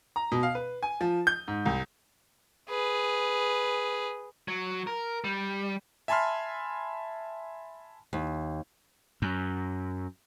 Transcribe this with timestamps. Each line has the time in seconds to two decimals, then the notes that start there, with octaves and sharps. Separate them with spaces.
0.16 A#5
0.32 B2
0.43 F5
0.55 B4
0.83 G#5
1.01 F3
1.27 G6
1.48 G#2
1.65 C2
2.69 G#4 B4
4.48 F#3
4.87 A#4
5.24 G3
6.08 E5 G#5 A5 B5 C6 F6
8.13 D#2
9.22 F#2